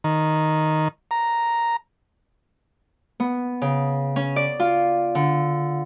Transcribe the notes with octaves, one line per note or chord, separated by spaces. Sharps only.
D#3
A#5
B3
C#3
C#4
D5
F4
D3